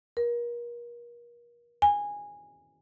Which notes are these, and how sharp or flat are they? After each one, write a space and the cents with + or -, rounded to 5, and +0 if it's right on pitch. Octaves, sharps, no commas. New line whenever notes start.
A#4 +35
G#5 -15